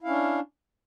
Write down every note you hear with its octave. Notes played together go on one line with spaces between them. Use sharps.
C#4 D4 E4 F5